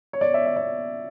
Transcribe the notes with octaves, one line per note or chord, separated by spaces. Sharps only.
C#5
D5
E5
E5
D5